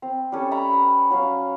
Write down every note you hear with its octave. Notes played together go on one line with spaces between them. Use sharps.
C4
G3 C#4 A4
E5 A#5 B5 C#6
B4
F#3 C#4 F5